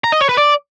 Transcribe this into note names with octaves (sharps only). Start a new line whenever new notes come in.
A#5
D#5
C#5
B4
D5